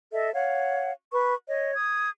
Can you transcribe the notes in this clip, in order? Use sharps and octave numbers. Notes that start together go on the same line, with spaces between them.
A4 D#5 E5
C#5 F5 F#5
B4 C#6
C#5 D#5
D#6 G#6